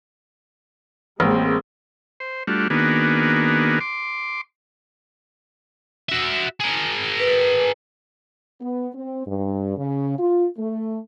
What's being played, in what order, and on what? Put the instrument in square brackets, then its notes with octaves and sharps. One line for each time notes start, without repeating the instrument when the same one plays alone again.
[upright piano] A1 [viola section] G#3 A#3 C4
[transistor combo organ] C5
G3 A3 D4 F4 F#4
D#3 A#3 B3 D4 F#4 G#4
C6 D6
[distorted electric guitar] F#4 E5
G#4 A#4
[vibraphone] B4
[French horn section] B3
C4
G2
C#3
F4
A3